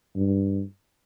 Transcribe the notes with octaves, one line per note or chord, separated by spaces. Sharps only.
G2